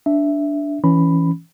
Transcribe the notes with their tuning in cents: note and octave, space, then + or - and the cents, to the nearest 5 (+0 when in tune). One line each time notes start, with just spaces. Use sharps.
D4 -10 E5 +0
E3 +0 C#4 +0 B5 +5